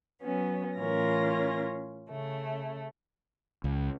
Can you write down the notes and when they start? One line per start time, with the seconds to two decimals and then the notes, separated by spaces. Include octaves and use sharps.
0.21 F#3 B3 C#4
0.79 A2 E3 C#4 F4 A#4 A#6
2.09 C#3 A3
3.64 C#2